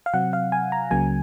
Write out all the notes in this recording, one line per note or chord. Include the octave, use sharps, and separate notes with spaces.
F5
C3 F#3 C4 F#5
F5
G#5
A#5
C#2 C#3 F#3 A#3 G#5